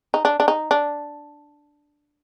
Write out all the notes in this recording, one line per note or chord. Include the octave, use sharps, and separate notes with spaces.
D#4
D4
D4
D#4
D4